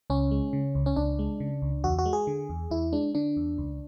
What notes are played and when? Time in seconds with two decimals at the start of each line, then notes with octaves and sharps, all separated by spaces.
0.10 C#2 C#4
0.31 G#3
0.53 C#3
0.75 C#2
0.86 C#4
0.96 C#2 D4
1.19 G#3
1.40 C#3
1.62 C#2
1.84 E2 F#4
1.99 F#4
2.05 G#3
2.13 G#4
2.27 D3
2.49 E2
2.71 E2 E4
2.93 G#3 D4
3.15 D3 D4
3.37 E2
3.58 C#2